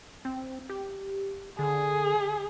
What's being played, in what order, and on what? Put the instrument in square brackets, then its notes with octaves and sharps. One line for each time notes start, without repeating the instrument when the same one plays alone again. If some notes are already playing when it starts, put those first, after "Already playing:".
[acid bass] C4
G4
[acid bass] D3 [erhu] G#4